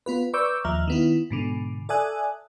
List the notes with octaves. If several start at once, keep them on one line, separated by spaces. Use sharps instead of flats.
B3 F4 B4
B4 D5 C#6 D6 E6 G6
D#2 F3 E5 A#5 F6
D#3 B3 E4
G#2 B2 D3
A4 D5 E5 G#5 D#6 F#6